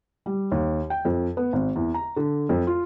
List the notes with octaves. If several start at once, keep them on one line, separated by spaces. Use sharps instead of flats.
G3
D#2
G5
F2
B3
G#1
E2
A#5
D3
F2
F4